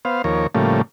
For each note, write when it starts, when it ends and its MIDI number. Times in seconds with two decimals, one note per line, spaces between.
0.05 0.22 59
0.05 0.22 72
0.05 0.22 77
0.24 0.47 39
0.24 0.47 53
0.24 0.47 70
0.24 0.47 73
0.55 0.82 45
0.55 0.82 49
0.55 0.82 53
0.55 0.82 55
0.55 0.82 57
0.55 0.82 58